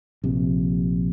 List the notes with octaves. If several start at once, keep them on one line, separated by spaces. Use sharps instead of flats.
A#1 C3